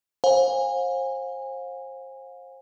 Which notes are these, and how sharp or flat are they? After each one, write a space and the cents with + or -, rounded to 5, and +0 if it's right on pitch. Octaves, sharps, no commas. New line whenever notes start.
C5 +30 F5 +40 G#5 -25